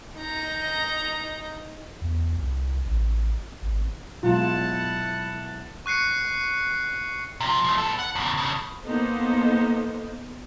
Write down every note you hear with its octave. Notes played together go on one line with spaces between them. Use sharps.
D#4 A#5
E2
C2
A1
G#1
B2 F#3 G#3 E4 F4 F#5 A5
C#6 F#6 C7 C#7
C3 F3
F3 A3
B3 A4
F#5
E2 C#3
G2 C#3
A#3 B3 D#4 A4 C5